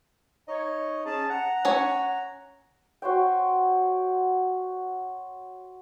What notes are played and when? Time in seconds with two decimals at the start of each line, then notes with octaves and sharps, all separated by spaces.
0.48 D#4 C#5 D#5
1.06 C#4 G#4 A5
1.30 F#5 A#5
1.65 C#4 C#5
3.02 F#4 C5 C#5 G5